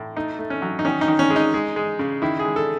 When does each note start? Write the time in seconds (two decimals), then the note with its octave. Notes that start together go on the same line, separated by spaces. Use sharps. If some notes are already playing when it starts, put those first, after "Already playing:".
Already playing: A2
0.16 A3 D#4
0.39 A3
0.50 C#4
0.62 F#3
0.79 D#4
0.85 D#3 C#4
1.01 D#4
1.08 D#3
1.19 C#4
1.30 G#3
1.36 D#4
1.54 G#3
1.76 G#3
1.99 C#3
2.22 D#3 E4
2.39 G#4
2.45 G#3
2.56 A4